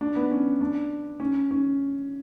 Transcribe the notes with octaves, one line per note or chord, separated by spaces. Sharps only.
D4
B3
C#4
D4
C#4
C#4